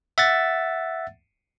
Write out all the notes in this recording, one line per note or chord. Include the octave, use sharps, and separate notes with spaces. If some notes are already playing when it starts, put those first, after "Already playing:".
E5 F#5 A6